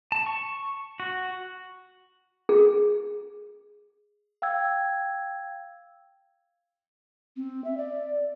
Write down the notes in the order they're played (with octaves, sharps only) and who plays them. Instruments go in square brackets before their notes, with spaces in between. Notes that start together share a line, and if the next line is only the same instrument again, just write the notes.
[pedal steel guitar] A5
C#6
F#4
[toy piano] G#4
[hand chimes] F5 G5 E6 G#6
[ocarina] C4
E5
D5